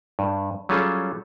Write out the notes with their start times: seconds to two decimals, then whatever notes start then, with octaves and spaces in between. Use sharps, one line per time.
0.19 G2
0.69 F#3 G3 C#4 F4 G#4 A4